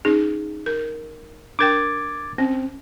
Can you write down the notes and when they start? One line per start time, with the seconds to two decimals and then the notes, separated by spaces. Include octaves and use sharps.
0.05 C#4 D#4 G#4
0.66 A#4
1.59 D4 A#4 G5 D6 G#6 A6
2.38 C4 C#4